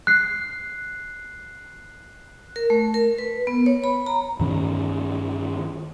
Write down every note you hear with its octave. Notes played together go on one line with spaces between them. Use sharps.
F#6 C7
A#4
A3
A#4
B4
B3
C#5
B5
A#5
G2 D#3 C#4